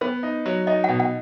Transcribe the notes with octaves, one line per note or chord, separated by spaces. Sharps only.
B3 C5
D#4
F#3
D#4 D#5
B2 F#5
F#5